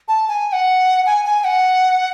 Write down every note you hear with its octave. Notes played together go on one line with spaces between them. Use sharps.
A5
G#5
G#5
F#5
G#5
G#5
F#5